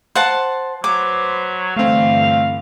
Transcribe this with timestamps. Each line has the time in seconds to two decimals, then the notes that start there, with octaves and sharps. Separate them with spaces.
0.15 C5 F#5 A5
0.84 F#3 B4 C5 D6
1.76 G2 D3 E3 A3 C4 F5